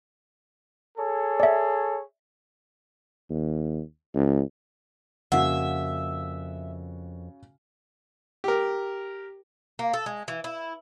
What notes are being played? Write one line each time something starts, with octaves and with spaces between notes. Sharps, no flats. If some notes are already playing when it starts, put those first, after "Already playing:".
G#4 A4 C#5
D5 E5
D#2
C#2
F2 C#3 A#3 F#4 E5 F#5 E6
G4 A#4
A#3
A4
G#3
E3
E4